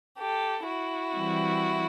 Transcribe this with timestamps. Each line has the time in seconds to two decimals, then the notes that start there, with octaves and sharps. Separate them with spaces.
0.19 G4 A4
0.66 E4 F#4
1.15 E3 G3 C4